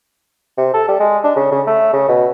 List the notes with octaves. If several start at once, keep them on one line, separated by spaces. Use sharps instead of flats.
C3
A4
G3
G#3
D4
C#3
C#3
A3
C#3
B2